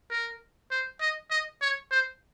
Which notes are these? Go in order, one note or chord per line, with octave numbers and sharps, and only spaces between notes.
A#4
C5
D#5
D#5
C#5
C5